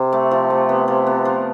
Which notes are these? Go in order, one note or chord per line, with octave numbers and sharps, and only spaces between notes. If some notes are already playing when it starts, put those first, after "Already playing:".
Already playing: C3
A3
F3
A3
B3
F3
B3
F3